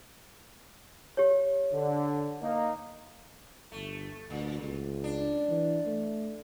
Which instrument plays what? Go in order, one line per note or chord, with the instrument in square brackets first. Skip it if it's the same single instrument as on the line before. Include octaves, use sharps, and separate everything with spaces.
[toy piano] G4 C#5
[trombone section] D3
A#3 D#4
[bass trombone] G1 [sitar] A3
[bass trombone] D2 [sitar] A#2
[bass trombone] C#2
[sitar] D4
[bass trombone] E3
A3